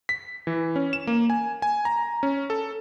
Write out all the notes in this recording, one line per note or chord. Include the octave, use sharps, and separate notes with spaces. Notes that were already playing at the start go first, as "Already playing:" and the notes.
B6
E3
C#4
E7
A#3
G#5
G#5
A#5
C#4
A4